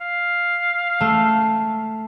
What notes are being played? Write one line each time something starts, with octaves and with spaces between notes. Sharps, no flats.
F5
A3